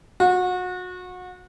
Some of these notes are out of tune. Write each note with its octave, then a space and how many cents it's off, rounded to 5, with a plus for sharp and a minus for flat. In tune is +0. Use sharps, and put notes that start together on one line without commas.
F#4 -30